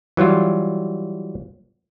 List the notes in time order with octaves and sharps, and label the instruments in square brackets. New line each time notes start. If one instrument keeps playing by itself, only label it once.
[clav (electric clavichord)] E3 F#3 G3 F4